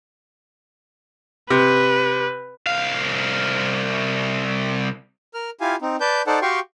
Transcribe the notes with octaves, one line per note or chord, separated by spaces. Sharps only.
C3 B4
C2 F5
A#4 F6
E4 F4 G4 F5 G#5
C4 D#4
B4 D5 A5 G6
D#4 A4 C5 D5 F#5 A5
F#4 G4 F5 G5 C6 C#6